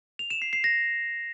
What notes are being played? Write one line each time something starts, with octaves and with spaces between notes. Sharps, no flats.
F7
E7
C7
C7
A#6